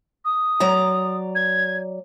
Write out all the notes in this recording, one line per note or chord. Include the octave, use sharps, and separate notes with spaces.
D#6
F#3 D5 A#5
G#6